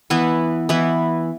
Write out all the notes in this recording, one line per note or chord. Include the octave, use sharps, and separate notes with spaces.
E3 B3 E4 B4
E3 B3 E4 B4